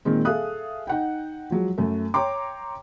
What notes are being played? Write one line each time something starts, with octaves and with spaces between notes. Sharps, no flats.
A#2 D#3 G#3 C4
G#4 A4 E5 F5 D#6 F#6
D#4 F#5 G5
F3 F#3 G#3
F#2 A3
C#5 G5 A#5 C6 D6